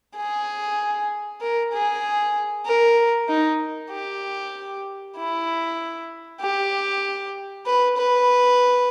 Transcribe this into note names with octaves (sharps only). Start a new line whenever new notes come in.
G#4
A#4
G#4
A#4
D#4
G4
E4
G4
B4
B4